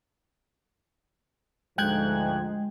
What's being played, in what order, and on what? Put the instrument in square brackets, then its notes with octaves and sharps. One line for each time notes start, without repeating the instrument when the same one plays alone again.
[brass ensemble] D2 G#2 F3 [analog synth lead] G#3 [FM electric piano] G5 F#6 G#6